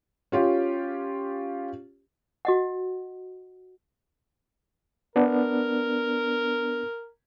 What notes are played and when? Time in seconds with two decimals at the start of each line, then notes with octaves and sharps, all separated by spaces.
0.32 C#4 F4 G4
2.45 F#4 D#5 F#5
5.16 B3 D4 A#4